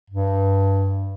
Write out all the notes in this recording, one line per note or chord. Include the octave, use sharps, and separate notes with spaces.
G2